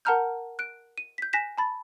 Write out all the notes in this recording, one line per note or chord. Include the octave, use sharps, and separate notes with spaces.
A#4 F#5 A5 A#5 F6 G6
F#6 D7
D#7
G6 B6
G#5 F#6 A#6 B6 E7
A5 B5 A6